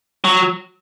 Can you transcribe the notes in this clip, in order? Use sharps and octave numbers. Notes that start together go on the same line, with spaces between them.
F#3